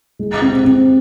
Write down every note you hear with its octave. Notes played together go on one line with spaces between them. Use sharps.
G#3
C4
C4